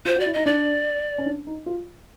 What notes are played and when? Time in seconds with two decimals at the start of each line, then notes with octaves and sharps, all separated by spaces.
0.05 F4 C5
0.16 F#4
0.20 D5
0.26 E4
0.33 D#4 D#5
0.46 D4 D5
1.18 C#4
1.26 D4
1.47 D#4
1.66 F4